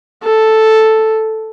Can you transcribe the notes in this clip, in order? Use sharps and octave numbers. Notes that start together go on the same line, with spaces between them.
A4